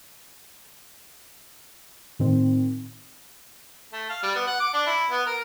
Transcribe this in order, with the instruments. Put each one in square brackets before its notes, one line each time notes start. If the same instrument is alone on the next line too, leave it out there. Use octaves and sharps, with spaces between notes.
[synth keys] A2 D#3 C4
[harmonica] A3
F5
G3
B3
F#5
D6
D4
E4
B3
A#4